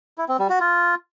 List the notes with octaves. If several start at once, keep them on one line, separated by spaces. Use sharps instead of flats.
E4
C4
G3
F#4
F4